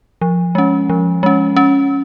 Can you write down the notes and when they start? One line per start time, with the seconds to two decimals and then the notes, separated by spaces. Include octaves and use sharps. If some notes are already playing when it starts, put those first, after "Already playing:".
0.21 F3
0.55 G#3 C#4
0.89 F3
1.23 G#3 C#4
1.57 C#4